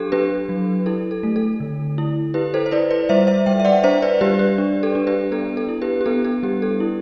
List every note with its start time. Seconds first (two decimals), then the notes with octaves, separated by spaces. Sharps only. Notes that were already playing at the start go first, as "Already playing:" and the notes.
Already playing: F#3 D4 G4 A4
0.12 D4 G4 B4
0.49 F#3
0.86 E4 A4
1.11 A4
1.23 A3
1.36 A4
1.60 D3
1.98 E4
2.34 E4 G4 B4
2.54 A4 C5
2.66 C5
2.71 E4 B4 D5
2.91 B4 D5
3.09 G3 C5 E5
3.27 C5 E5
3.46 G3 E5 G5
3.60 E5
3.65 D5 F#5
3.84 D4 C5 E5
4.02 B4 D5
4.21 G3 G4 B4
4.39 G4
4.58 D4
4.83 A4
4.95 D4
5.07 G4 B4
5.31 B3 A4
5.57 A4
5.68 E4
5.82 G4 B4
6.01 G4
6.06 B3 A4
6.25 A4
6.43 G3 G4
6.62 A4
6.80 E4